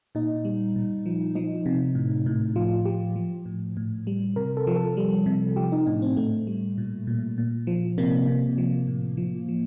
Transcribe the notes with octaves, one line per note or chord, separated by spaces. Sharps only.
A#2 D#4
G3
A#2
F3
F3 D#4
C3
A2
A2
F3 F4
F3 G4
F3
A2
A2
G3
C3 A#4
A4
F3
A4
G3
C3
F3 G4
D#4
A2 D4
C4
A2 A3
G3
A#2
A#2
A#2
F3
C3 A#3
C3
F3
A2
F3
F3